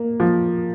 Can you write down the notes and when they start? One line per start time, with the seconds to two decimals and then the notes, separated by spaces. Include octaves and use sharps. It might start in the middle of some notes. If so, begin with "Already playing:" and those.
Already playing: A#3
0.20 F3